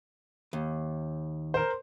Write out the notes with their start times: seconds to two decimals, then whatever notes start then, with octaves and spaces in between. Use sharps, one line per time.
0.53 D#2
1.54 A#4 C5